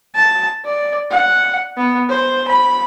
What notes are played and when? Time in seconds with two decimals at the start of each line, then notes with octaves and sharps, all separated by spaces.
0.15 A5
0.65 D5
1.11 F#5
1.77 B3
2.09 C5
2.48 B5